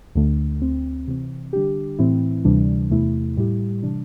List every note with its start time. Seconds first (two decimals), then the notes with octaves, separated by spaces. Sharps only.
0.15 D2 D3 A3
0.61 D2 D3 C4
1.07 C3 E3 C4
1.53 D3 G3 D4 G4
1.99 A2 E3 C4 E4
2.45 D2 C3 E3 G3 D4
2.91 E2 C3 A3 E4
3.37 A2 G3 E4 G4
3.83 C3 E3 G3 D4